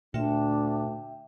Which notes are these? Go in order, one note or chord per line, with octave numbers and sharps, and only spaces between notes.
D2 A#2 D4 E5 G5